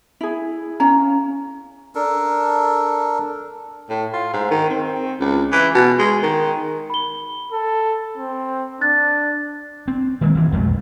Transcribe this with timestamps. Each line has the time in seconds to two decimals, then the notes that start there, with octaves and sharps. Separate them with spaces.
0.21 E4 G#4
0.80 C#4 C#5 F5 A#5
1.95 D4 A4 A#4
3.89 A2
4.13 F4
4.33 G#2
4.50 D#3
4.69 C4
5.20 C#2
5.52 E3
5.74 B2
5.98 G#3
6.22 D#3
6.90 B5 G7
7.52 A4
8.18 C4
8.81 D4 F#6 A6
9.88 C4
10.21 D#3 E3 G#3 A#3
10.35 G#1 E3
10.53 B1 F2 G#3 A3